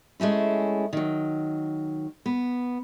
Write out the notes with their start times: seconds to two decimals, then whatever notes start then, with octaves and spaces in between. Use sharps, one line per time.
0.20 G#3 A3 C#4 E4
0.93 D#3 F#3
2.26 B3